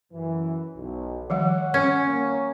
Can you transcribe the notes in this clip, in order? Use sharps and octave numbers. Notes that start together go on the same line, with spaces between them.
F#2 E3
B1
D#3 F3 G3 C#5 F#5
C#4
A#3 C#5